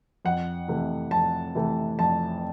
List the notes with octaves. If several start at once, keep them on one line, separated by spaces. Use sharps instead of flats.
F2 F#5
C3 E3 A3
F2 A5
C3 E3 A3
F2 A5